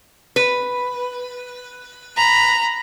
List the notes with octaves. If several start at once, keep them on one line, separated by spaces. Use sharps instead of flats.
B4
A#5 B5